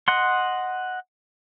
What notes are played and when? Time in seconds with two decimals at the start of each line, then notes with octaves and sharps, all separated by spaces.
0.08 D#5 F#5 C6